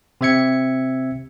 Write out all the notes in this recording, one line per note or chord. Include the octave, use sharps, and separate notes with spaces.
C3 C4 E5 G#6 C#7